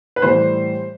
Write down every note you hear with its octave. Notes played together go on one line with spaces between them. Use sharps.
B4
A2 E3 G3 C5